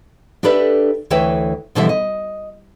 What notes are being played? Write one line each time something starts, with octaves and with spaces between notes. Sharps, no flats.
D4 G4 A4 B4 D5 E5
D2 E3 B4 C#5 E5 G5
B2 D3 E3 F3 G3 E5
D#5